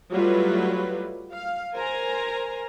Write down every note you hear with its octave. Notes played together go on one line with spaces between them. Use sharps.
F#3 G3 A3 E4 F4 B4
F5
A#4 C5 G#5 A#5